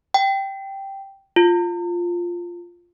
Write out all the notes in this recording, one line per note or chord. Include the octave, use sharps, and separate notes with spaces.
G5
F4